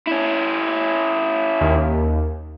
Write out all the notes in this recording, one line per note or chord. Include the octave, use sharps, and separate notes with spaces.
C#4 E4
D#2